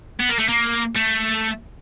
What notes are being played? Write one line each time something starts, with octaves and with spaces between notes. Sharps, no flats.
B3
A#3
A3
A#3
A3